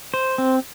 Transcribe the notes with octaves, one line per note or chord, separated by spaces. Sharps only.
C5
C4